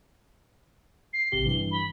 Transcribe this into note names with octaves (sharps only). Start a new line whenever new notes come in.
C7
A1 C3 G4 G7
G2 E3
B5